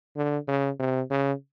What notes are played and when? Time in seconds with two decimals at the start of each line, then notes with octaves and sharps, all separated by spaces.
0.16 D3
0.48 C#3
0.80 C3
1.10 C#3